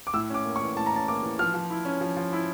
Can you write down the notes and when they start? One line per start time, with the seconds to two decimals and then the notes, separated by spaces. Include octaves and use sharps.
0.07 D6
0.14 A2 E6
0.30 C#4 D6
0.45 A#3
0.56 C#6
0.62 E3
0.76 A2 A5
0.86 A#5
0.92 C#4 A5
1.08 A#3 D6
1.23 E3
1.39 F3 F6
1.54 F3
1.71 E4
1.85 C#4
2.01 F3
2.16 F3
2.33 E4